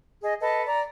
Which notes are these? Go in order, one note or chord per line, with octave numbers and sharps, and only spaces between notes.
G#4 D#5
A4 B4 D#5 A5
D5 A#5